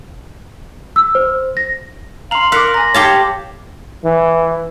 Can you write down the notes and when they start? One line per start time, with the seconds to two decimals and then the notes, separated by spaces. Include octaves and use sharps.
0.96 E6
1.15 C5
1.57 A#6
2.31 F5 A#5 C6 F7 F#7
2.52 A#4 F5 D6 F#6 B6 C#7
2.74 G#5 A#5 A#6
2.94 G4 C#5 F5 A5
4.04 E3